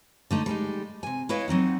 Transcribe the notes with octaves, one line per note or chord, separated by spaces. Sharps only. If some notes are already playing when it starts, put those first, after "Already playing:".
D3 A3 D#4
G3 G#3 C#4 D#4
C3 G#5
E4 B4 C#5 D#5 F5
F#3 C4 D#4 F#5